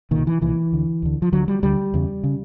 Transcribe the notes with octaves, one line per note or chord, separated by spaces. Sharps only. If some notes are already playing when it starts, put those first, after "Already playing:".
C2 A#2 D#3
E3
C2 A#2 E3
D2 D3
D2 D3
F3
D2 D3 F#3
G3
D2 D3 G3
E2 C#3
C#3